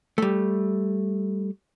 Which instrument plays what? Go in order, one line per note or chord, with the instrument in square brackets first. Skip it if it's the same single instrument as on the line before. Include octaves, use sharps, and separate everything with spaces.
[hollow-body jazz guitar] G3 A3